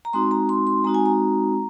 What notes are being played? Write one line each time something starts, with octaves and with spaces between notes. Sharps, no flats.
A#5
G#3 C4 D#4 F#4 C6
A#5
C6
C6
G#3 C4 D#4 F#4 A#5
G#5
A#5